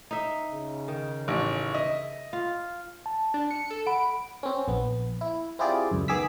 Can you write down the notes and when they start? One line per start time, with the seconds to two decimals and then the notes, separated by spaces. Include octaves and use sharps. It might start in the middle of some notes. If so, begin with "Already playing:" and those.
0.11 D#4 E5
0.51 C#3
0.88 D#3
1.28 A1
1.74 D#5 E5
2.33 F4
3.06 A5
3.34 D4
3.51 C#7
3.70 A4
3.86 F#5 B5 D7
4.43 C4 C#4
4.68 A#1 B3
5.21 E4
5.59 C4 E4 F4 G4 G#4 D5
5.91 C#2 F#2
6.08 D#3 B3 G#4 D6 E6 B6